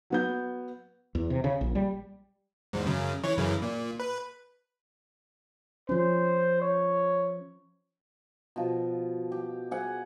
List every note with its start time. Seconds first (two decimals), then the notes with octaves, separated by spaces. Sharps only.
0.10 F#3 B3 G6
1.15 E2
1.30 C3
1.44 C#3
1.61 A#1
1.75 G3
2.73 E2 G#2
2.86 F#2 C#3
3.24 E3 C#5
3.37 F#2 C#3 E3
3.62 A#2
4.00 B4
5.89 F3 C#4 C5
6.61 C#5
8.56 B2 F3
9.32 G4
9.71 G#4 F#5